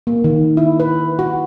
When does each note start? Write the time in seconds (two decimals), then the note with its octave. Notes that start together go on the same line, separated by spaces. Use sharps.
0.07 A#3
0.24 D#3
0.57 E4
0.80 B4
1.19 F#4